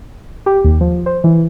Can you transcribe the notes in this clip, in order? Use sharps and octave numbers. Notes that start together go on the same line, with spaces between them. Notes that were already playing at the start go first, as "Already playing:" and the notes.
G4
D#2
F3
C5
E3